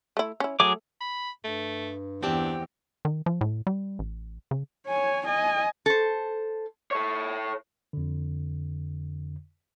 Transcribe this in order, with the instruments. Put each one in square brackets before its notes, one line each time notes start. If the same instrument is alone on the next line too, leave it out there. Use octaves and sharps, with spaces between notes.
[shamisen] A3 E4
C#4 E4
[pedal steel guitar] F#3 G#4 D6 [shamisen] A3
[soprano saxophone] B5
[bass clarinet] G2 [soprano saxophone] A3
[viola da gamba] E2 [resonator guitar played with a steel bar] C4 G4 [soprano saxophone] D4
[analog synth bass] D#3
F3
A2
G3
A1
C#3
[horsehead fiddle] C#5 G#5
D#5 G#5
[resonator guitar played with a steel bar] A4 C5
[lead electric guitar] A4 C#5
[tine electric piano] F2 D3